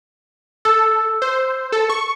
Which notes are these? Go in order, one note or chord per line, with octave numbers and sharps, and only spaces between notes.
A4 E6
C5
A4
C#6